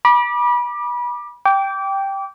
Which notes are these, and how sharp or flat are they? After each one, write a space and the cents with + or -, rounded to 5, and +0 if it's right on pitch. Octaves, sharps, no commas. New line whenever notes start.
B5 -30 D6 +15
G5 +0 D6 -25